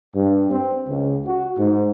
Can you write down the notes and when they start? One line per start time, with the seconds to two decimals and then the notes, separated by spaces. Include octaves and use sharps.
0.15 G2
0.50 C4
0.89 C#2
1.26 F#4
1.58 G#2